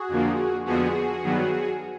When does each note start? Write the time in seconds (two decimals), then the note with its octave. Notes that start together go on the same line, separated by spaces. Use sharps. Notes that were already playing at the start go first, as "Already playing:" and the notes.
Already playing: F#4 G#4
0.08 F2 D3 F3 A#3
0.65 F2 D3 F3 G#3 B3 F#4 G#4
1.23 G2 D#3 F#3 B3